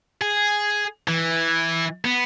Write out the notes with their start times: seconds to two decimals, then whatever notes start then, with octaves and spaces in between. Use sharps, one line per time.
0.22 G#4
1.08 E3
2.05 B3